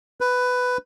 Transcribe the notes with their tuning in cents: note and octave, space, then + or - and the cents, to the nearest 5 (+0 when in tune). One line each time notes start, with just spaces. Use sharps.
B4 +10